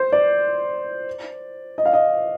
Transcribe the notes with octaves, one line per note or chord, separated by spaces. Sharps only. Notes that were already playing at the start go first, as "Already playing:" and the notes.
Already playing: C5
D5
D#5
F5
D#5